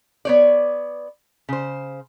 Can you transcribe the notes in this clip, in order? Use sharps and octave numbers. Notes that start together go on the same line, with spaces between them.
B3 C#5 D5
C#3 C5